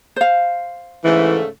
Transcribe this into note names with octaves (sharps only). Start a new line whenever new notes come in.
C5 F5
G#2 C#3 E3 A3